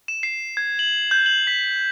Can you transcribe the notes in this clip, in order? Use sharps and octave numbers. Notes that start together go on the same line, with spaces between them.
E7
C7
G#6
F#7
G6
F#7
B6